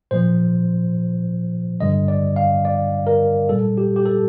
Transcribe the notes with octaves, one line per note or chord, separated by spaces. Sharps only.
A#2 F3 C5
G2 D3 G3 D#5
D5
F5
D5
A#4
A#2 G3 A4
G4
G4
A4